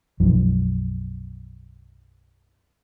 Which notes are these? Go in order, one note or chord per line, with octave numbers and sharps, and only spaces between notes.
B1 F#2 F3